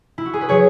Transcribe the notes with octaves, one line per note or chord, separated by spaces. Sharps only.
E4
F#4
G#4
B4
F#3 G#4 C#5